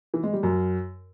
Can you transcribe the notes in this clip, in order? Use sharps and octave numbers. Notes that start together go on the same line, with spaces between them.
E3
G#3
G3
F#2